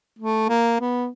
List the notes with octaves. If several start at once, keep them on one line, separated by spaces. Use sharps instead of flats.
A3
A#3
B3